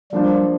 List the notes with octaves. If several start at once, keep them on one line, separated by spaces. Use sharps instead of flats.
F3 G3 A#3 D4 F4 C5